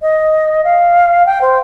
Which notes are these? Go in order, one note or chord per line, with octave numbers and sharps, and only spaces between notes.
D#5
F5
G5
C5